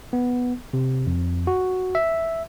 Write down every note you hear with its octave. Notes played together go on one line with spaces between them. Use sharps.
B3
C3
F2
F#4
E5